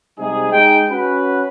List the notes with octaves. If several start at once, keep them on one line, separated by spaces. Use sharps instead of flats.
C3 G3 G#3 D#4 G#4
G#3 D#4 G5
C#4 F#4 B4